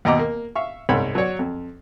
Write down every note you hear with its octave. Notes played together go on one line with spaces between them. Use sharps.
D#2 B2 D#5 A#5 D6
A#3
E5 F5 C#6
C2 G#2 C4 C#5 G5 B5
F#3 F#4 C#5 D5
F2